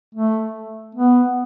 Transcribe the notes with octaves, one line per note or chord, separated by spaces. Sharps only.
A3
B3